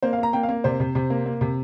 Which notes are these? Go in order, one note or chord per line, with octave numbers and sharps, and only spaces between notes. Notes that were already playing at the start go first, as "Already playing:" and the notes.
A#3 C5
F5
A#3 A#5
A#3 G5
F5
A#3
C3 C5
C3
C3
A#3
A#3
C3